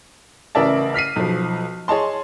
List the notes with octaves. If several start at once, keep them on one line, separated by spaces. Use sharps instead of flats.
A1 C#3 A#4 D5 E5 A5
F6 B6 C7 D#7
B1 F3
G#4 C#5 D#5 A5 C6